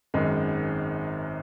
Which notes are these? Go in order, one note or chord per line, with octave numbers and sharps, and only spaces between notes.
G#1 F#2 D#3 G#3